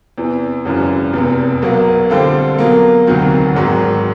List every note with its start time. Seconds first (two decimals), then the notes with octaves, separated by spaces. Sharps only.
0.18 E2 C3 E3
0.65 G#1 F#2 C#3 E3
1.13 F1 E2 C3
1.62 B1 B2 F#3 A#3
2.10 D3 G3 C4 F4 A4
2.59 B2 F#3 A#3
3.07 E1 D2 C3 D#3 F#3
3.55 G#1 G#2 D#3 F#3